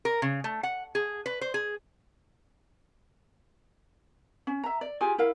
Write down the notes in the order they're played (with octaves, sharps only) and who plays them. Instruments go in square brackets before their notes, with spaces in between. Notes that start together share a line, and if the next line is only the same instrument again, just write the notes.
[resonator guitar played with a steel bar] A#4
C#3
A3
F#5
G#4
B4
C5
G#4
[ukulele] C#4
E5 A#5
D5
F4 G4 G#4 G#5
E4 A#4 F5